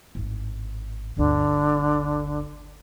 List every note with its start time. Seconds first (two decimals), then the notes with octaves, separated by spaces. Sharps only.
0.15 G#1 A2
1.17 G1 D2 D3